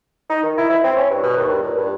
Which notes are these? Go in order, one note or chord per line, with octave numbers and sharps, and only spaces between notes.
D#4
D#3
E4
E4
C4
C#4
G2
B2
D#2
G2
A#2
G2